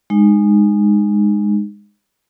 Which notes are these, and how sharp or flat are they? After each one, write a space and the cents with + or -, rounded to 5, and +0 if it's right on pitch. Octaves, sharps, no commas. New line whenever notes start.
G#3 -5 D#4 -25